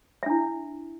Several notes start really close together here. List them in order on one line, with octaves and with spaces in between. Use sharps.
E5 D4 E4